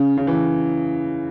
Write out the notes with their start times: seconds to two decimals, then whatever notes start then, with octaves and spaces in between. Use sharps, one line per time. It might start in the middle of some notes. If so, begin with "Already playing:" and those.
Already playing: C#3
0.17 C#3
0.27 E3